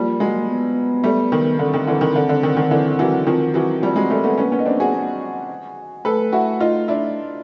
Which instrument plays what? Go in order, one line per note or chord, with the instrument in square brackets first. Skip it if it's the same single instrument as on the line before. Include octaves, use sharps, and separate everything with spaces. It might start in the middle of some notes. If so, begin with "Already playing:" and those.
Already playing: [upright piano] F3 G3 [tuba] A#3
[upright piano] F#3 G#3
[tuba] B3
[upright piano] G3 A3
D#3
[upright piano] D3 [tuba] C4
[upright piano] D#3
D3 E3
D#3
D3
D3
D#3
D#3
D3 E3
E3 F#3
[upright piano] D#3 F3 [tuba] C4
[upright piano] E3 F#3
F3 G3
F#3 G#3
G3 A3
A3 B3
[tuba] A#3 [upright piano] B3 C#4
[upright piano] B3 C#4
D#4
C4 D4
F#4 G#4
[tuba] A3 [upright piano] A4 B4
[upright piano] E4 F#4
D#4 F4
D4 E4